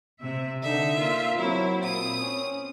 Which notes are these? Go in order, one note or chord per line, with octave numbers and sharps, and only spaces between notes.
C3 E5
D3 D#4 E5
A#3 F4
F#3 C4 E4
A#2 D#6
C#4